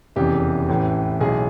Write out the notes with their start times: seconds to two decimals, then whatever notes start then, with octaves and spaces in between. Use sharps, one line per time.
0.16 F1 E2 C#3 E3 G4
0.68 A1 A2 E3
1.21 B1 A2 E3 G#4